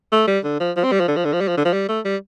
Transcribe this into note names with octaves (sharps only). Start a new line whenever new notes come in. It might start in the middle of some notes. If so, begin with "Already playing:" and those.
A3
G3
D3
F3
F3
C4
G3
F3
D3
F3
D3
F3
G3
F3
D3
F3
G3
A3
G3